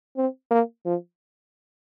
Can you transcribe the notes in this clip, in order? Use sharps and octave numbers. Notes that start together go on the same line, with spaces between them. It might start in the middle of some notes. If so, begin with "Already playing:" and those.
C4
A#3
F3